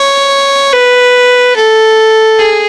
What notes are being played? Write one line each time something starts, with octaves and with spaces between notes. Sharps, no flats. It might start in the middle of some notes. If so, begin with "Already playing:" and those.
Already playing: C#5
B4
A4
G#4